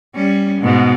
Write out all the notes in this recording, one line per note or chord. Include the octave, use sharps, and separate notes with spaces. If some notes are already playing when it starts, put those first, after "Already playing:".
G3 C#4
G#2 B2